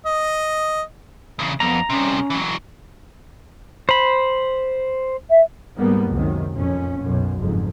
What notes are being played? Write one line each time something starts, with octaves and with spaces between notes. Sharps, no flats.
D#5
E2 C#3
F2 B3 A#5
C2 C3 C#4
E3 F#3
C5 B5
E5
G#2 G3 A#3 B3
C#2 F#2 C3 D#3
F2 A#2 C#4
B1 F#2
F#1 F2 G#2